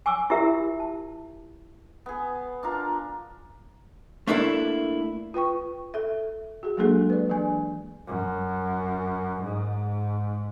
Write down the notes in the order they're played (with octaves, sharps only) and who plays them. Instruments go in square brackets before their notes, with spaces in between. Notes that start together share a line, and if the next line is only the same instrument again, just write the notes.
[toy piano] G#5 C#6 D6 E6
E4 F4 G4 A#4 E5
A5
[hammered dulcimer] B3 G#4
D4 F4 A#4
[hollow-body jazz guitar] A3 A#3 D4 E4 A4
[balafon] F4 B4 G5 C#6
A4 E5
F#4 G#4
F#3 G#3 A#3 D4 G#4 A4
B4 D5
E3 D4 G#5
[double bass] F#2
G#2